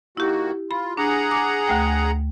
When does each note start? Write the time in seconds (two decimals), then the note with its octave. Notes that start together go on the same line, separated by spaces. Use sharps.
0.17 D#3 A#3 E4 F#4 G4
0.71 F4 B5
0.97 D4 G#4 F#5 A#5
1.31 D6
1.68 D2 A3 G5